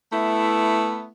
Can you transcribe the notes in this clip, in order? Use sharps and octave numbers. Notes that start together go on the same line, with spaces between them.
A3 B3 E4